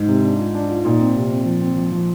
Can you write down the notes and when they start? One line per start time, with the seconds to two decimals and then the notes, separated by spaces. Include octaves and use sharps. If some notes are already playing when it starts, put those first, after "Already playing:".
Already playing: G#2
0.08 C3
0.24 D4
0.39 F4
0.55 D4
0.70 F4
0.85 A#2 D#4
1.00 C4
1.16 C3
1.31 C4
1.46 F3
1.62 C4
1.76 F3
1.92 F3